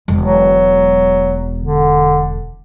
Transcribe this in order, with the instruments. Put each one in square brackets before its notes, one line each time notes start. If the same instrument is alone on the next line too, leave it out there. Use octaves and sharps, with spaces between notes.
[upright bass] E1 G#3
[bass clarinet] F#3
D3